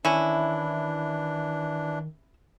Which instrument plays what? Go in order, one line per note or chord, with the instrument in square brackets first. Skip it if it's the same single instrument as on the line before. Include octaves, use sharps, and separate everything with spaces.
[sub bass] D#3 [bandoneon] E3 D4 [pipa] C#4 E4